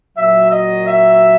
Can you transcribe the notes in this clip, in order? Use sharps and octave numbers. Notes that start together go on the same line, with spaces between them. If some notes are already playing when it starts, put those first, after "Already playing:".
A#2 F#3 E5
D#5
E5